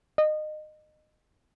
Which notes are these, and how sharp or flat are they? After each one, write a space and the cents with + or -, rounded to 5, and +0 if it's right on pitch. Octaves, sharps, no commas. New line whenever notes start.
D#5 -25